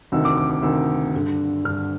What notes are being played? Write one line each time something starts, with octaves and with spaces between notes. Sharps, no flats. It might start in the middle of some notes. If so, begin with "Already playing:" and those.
D2 C3 D#3 E6
D6
D6
D6
D2 C3 D#3 E6
G2 D3
G2 D3 F6